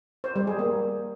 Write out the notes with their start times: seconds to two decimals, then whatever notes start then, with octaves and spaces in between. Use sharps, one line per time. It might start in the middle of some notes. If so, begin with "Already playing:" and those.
0.24 C5
0.36 G3
0.47 G#4
0.59 A#3